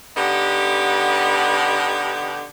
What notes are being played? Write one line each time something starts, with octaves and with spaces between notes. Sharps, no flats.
D3 B3 D#4 G4